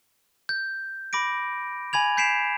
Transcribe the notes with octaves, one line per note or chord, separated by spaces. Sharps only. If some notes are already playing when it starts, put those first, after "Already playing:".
G6
B5 D6 A#6 D7
G#5 B5 G#6 F7
G6 B6 C7 D7 E7 F7